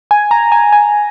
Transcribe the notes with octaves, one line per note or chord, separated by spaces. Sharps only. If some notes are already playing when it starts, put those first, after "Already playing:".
G#5
A#5
G#5
G#5